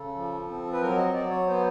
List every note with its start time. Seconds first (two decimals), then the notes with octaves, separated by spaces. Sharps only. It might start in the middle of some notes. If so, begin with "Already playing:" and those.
Already playing: C#3 A4
0.15 F3
0.48 C4
0.73 B4
0.82 F#3 A#4
0.97 D#5
1.14 F#3 D5
1.30 C#5
1.47 B3 C5